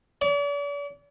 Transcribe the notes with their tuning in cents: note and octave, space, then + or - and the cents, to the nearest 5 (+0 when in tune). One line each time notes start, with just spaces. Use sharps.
D5 -45